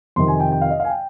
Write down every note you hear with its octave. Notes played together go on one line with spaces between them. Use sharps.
F2 C3 D#3 C6
G#5
G5
G5
F5
D#5
F5
G#5
G5